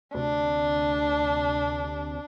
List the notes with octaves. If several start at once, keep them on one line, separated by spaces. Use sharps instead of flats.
D2 C3 D4